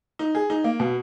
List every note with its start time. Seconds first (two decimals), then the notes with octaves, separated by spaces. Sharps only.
0.19 D#4
0.35 G#4
0.50 D#4
0.64 A#3
0.80 B2